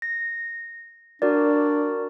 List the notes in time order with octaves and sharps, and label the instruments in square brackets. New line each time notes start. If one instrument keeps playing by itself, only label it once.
[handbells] A#6
[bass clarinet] D4 [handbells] F#4 A#4 D5